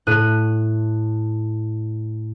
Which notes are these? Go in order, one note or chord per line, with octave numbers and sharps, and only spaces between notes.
A2 F#6 D#7